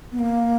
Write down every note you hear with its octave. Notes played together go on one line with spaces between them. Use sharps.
B3
A#3